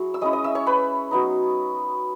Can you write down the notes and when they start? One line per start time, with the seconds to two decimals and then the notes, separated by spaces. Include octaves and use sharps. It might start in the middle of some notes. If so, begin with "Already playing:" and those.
Already playing: F#3 E4 G#4 C#5
0.14 E6
0.21 G#3 C#4 E4 D#5 D#6
0.33 D#5 D#6
0.44 E5 E6
0.55 C#5 C#6
0.66 B4 B5
1.11 F#3 B3 D#4